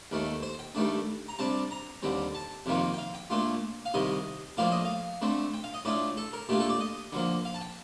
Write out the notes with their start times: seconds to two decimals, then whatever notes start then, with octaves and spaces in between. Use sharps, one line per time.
0.11 D#2 D#3 A3
0.43 C5
0.59 G5
0.75 G2 D#3 A3 D4
1.29 A#5
1.39 C3 G3 D4 A5
1.71 A#5
2.03 D#2 D3 G3 C4
2.35 A5
2.66 F2 C3 D#3 A#3 F4
2.93 G5
2.98 F5
3.14 G5
3.30 A#2 A3 D4 F4
3.85 F5
3.94 C2 C3 D#3 D#5
4.57 A2 F3 A#3 D4 F5
4.72 D#5
4.85 F5
5.22 D3 A3 C4
5.54 G5
5.64 F5
5.74 D#5
5.85 A2 A3 D4 F4 D5
6.17 A4
6.33 A#4
6.49 A#2 A3 D4 F4 G4
6.60 A4
6.70 D5
6.80 D#5
7.12 D3 F3 A#3
7.45 F5
7.54 A5
7.61 G5